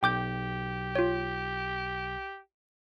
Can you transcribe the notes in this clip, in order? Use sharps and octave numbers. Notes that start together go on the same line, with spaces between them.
B1 G4 G5 D6 G6
F4 C#5